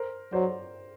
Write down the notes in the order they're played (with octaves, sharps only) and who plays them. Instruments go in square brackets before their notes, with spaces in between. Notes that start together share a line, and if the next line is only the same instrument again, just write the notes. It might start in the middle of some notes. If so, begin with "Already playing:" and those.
Already playing: [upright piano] A#4 C5
[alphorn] F#3 [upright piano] C5 D5